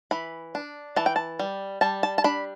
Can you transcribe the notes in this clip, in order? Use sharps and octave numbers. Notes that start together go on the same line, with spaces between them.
E3 B5
D4
E3 A5
G5
A5
G3
G3 A5
A5
A5
D4 B5